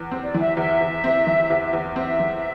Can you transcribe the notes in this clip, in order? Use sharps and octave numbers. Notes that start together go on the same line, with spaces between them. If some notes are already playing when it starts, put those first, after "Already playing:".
Already playing: E2
C4
D5
E3
E5
E2 E5
E2
C4
E3
E2
E2
C4 E5
E3